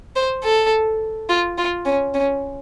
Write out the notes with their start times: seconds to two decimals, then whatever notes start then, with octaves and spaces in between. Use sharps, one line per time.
0.16 C5
0.44 A4
1.29 F4
1.58 F4
1.85 C#4
2.14 C#4